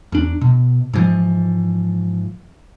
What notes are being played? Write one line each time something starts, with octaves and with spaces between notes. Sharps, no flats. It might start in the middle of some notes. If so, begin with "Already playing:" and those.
E2 D4
B2
G#2 E3 F3